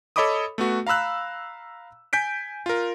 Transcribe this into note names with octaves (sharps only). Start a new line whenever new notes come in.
A4 C#5 D#5 B5 D6 D#6
A3 B3 F#4
F5 A#5 B5 E6 F#6
G#5 G6 B6 D7
F4 A#4